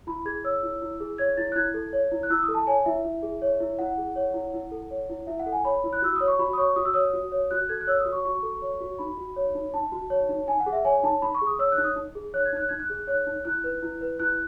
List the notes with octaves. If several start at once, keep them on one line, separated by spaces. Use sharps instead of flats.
E4 B5
G#4 G#6
C#5 E6
E4
E4
G#4
C#5 G#6
E4 A6
F#6
E4 G#6
A4
C#5
E4
F#6
E4 E6
D#6
A4
A5
C#5 G#5
E4 E5
E4
G#4
C#5
E4
E4 F#5
G#4
C#5
E4
E4
A4
C#5
E4
E4 E5
F#5
A4
G#5
C#5 B5
E4
F#6
F#4 E6
C#5 D#6
C#6
F#4 B5
D#6
C#5 C#6
F#4 D#6
E6
C#5 D#6
F#4
C#5
F#4 F#6
A4 G#6
F#6
C#5 E6
D#6
F#4
C#6
F#4 C#6
A4
C#5
F#4
D#4 B5
F#4
C#5
D#4
D#4 A5
F#4
C#5
D#4
D#4 G#5
F#5
G#4
E5
C#5 G#5
D#4 A5
D#4 B5
C#6
G#4
D#6
C#5 E6
F#6
D#4
D#6
D#4
G#4
C#5 F#6
G#6
D#4 F#6
D#4 G#6
F#6
G#4
C#5 F#6
D#4
E4 F#6
B4
E4
B4
E4 F#6